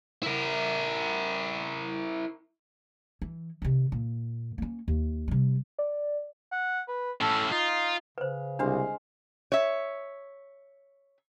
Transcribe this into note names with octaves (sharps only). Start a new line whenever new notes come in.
E4 A#4
E3
C3 D#3
A#2
A#3 C#4
D#2
C3 G3
D5
F#5
B4
A2 C#4 A4
D#4 F4
C#3 B4 C5
C2 G#3 D4 C5 F5
C#5 E5